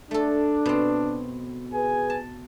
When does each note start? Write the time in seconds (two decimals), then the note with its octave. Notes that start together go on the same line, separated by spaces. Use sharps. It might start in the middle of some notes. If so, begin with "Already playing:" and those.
0.11 A3 D4 A4
0.65 B2 C4
1.73 G#4 B4 G#5
2.10 A5